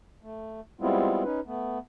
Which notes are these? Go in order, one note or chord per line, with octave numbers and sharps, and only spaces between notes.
A3
G3 G#3 B3 C4 E4 F4
C#4 D#4 B4
A3 B3